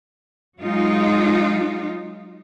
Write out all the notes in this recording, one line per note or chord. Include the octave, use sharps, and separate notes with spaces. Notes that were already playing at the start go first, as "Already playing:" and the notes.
F#3 G#3 D#4 F4